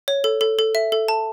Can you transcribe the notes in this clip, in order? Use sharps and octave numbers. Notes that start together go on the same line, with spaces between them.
C#5
A4
A4
A4
E5
A4
A5